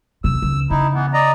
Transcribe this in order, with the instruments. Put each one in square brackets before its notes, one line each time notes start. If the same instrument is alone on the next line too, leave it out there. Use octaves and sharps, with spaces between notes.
[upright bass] F2 C3 [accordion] E6
[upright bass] C#2
[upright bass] C#3 [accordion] D#4 E4
[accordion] E3 B3
D5 D#5 A#5